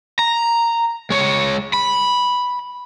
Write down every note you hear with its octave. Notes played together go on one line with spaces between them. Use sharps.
A#5
G#3 C#5
B5